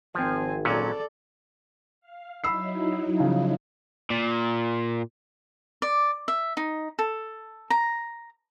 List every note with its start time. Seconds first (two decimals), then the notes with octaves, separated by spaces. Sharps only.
0.15 G#1 F3 C4 G#5
0.65 A#2 F#3 C#4 A4 D5
2.01 F5
2.44 F#3 D#4 E4 B5 E6 C7
3.20 C#3 F3
4.11 A#2
5.82 D5
6.28 E5
6.57 D#4
6.99 A4
7.70 A#5